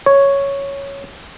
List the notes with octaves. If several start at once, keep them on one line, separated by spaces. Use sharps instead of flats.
C#5